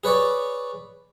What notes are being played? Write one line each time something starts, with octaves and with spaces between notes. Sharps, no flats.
G#4 B4 C#5 D5